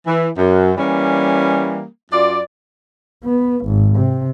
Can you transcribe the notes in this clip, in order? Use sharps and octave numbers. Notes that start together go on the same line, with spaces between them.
E3
F#2
E3 G3 A#3 C#4
F#2 F4 D5
B3
G#1
C3